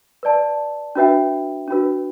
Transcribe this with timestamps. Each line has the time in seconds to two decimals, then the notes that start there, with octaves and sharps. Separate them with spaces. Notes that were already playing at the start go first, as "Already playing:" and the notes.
0.23 B4 D5 A5
0.95 D4 F#4 B4 E5 G5
1.68 D4 F#4 B4